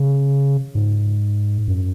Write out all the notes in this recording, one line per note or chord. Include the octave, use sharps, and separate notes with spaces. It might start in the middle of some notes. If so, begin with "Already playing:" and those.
Already playing: C#3
G#2
F#2